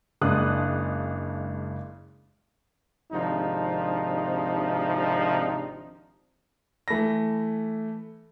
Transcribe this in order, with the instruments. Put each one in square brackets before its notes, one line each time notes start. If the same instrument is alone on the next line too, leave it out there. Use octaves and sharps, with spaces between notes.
[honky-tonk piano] F#1 C#3 G#3 D4 D#6 F#6
[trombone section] G#1 C3 F3 D4 D#4
[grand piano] E3 A3 B5 A#6